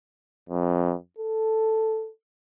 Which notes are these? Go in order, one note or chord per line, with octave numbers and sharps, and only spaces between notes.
F2
A4